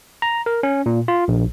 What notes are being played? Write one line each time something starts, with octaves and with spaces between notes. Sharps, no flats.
A#5
A#4
C#4
A#2
F4
A#1